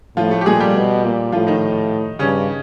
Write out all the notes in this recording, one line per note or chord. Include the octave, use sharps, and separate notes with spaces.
A2 F3 F4
A3 A4
G4
A#2 G#3 G#4
G3 G4
B2
A#2
A2 F3 F4
D#3 D#4
G2 C#3 C#4